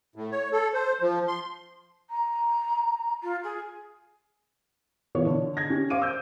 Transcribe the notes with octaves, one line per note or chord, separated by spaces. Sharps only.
A2
C#5
A4
C5
F3
C6
A#5
F4
G#4
E3 B3 F4 B4 C#5
D3
G#6 A#6
C#4 G4
C5 F5 D6 D7 D#7
E6 G6